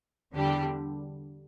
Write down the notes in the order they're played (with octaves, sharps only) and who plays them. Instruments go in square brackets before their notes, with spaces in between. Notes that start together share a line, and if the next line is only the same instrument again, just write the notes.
[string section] E2 D3 G3 D4 G4